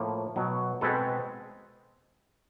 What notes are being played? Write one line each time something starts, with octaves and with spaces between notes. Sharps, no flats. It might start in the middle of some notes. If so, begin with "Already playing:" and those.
Already playing: A2 F3 A#3
B2 F#3 B3
B2 G#3 C4 A4 B4